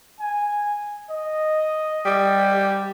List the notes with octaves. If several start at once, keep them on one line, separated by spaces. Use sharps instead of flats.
G#5
D#5
G3
G4